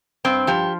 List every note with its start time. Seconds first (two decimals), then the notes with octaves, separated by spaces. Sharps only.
0.25 G2 C4
0.47 F3 G4